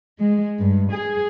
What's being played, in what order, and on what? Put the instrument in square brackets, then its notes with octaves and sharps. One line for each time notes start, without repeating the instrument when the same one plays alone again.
[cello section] G#3
G2
G#4